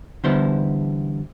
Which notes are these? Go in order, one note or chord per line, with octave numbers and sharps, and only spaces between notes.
E2 D3 G3 B3 E4 C5